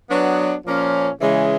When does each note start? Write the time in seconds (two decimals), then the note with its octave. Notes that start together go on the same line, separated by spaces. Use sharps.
0.10 F#3 B3 D4
0.66 A#2 F3 A#3 C#4
1.21 C#3 E3 G#3